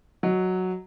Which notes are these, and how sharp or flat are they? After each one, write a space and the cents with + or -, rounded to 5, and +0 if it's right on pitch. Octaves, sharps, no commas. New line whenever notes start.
F#3 +0 D#5 +0